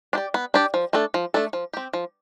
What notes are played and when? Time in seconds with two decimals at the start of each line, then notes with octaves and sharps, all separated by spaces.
0.13 D4 G4 D5
0.34 B3
0.54 D4 G4 D5
0.74 F3
0.93 A3 D4 A4
1.14 F3
1.34 A3 D4 A4
1.53 F3
1.73 C4 G4
1.93 F3